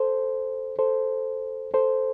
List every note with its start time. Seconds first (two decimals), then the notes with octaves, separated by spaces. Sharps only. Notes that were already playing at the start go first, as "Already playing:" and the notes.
Already playing: A4 C5
0.79 A4 C5
1.74 A4 C5